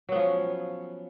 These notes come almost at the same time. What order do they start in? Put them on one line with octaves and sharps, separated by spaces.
F#3 B3 F3 C#4